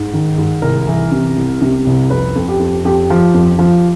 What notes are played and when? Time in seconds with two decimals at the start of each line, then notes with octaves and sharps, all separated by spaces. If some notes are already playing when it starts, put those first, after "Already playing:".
Already playing: G#2
0.13 D#3
0.38 G#2
0.62 C2 A#4
0.87 E3
1.12 C3
1.36 C2
1.62 C3
1.86 C2
2.10 F2 B4
2.36 F2
2.48 G4
2.60 F2
2.85 F2 G4
3.10 F3
3.34 F2
3.59 F3